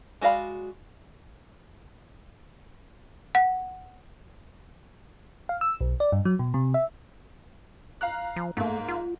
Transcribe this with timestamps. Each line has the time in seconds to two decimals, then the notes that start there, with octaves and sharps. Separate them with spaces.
0.21 G#3 F#4 D5 F5 B5
3.35 F#5
5.49 F5
5.61 E6
5.81 B1
6.00 D5
6.12 G2
6.25 F#3
6.39 B2
6.54 C3
6.74 E5
8.01 F5 A#5 F#6
8.36 F3
8.57 G#2 A3 A#3
8.88 F4